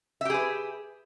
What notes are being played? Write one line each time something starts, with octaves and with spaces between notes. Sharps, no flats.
G4 G#4 B4 E5